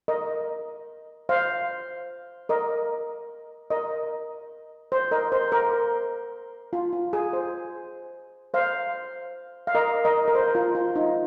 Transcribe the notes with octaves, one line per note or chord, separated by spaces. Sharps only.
A#4 D#5
C5 F5
A#4 D#5
A#4 D#5
C5
A#4 D#5
C5
A#4
F4
F4
G#4
C5
C5 F5
F5
A#4 D#5
A#4 D#5
A#4
C5
F4
F4
D#4